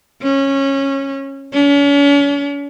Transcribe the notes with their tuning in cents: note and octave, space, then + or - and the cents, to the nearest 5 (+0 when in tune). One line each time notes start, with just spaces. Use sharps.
C#4 -15
C#4 +40